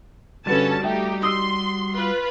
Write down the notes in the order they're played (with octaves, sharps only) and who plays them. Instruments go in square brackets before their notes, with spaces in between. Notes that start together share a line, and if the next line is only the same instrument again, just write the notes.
[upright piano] G1 B4 A6 [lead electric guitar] G3 F#4 [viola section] C#4 A4 A5
[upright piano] A3 E5 G5 [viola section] D#4 G4
[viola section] C6 [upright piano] D#6 E6
[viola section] F4 B4